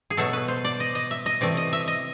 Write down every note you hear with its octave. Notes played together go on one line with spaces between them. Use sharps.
G#4
B2 F#3 A3 A4
B4
C5
D5
D#5
D#5
E5
D#5
C3 E3 A3 D5
D#5
E5
D#5